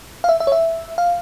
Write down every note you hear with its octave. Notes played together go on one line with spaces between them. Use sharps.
F5
E5
E5
C#5
E5
F5